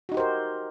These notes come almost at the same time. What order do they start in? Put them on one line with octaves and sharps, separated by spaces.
F#4 D#4 G4 C5 A#4